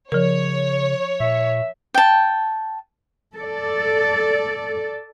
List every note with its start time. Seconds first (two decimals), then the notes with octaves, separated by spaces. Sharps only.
0.12 C#3 F3 A#4 C#5
1.20 A#2 E5
1.94 G5 A5
3.36 A4 D5